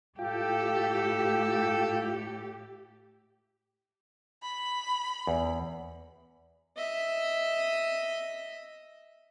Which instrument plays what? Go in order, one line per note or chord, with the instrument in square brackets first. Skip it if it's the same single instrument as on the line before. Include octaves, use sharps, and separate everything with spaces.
[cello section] A2 G4 [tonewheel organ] F4 G5 [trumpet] A4
[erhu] B5
[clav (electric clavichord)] E2
[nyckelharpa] D#5 E5